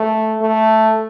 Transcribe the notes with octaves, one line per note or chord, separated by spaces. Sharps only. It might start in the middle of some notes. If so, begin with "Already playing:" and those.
Already playing: A3
A3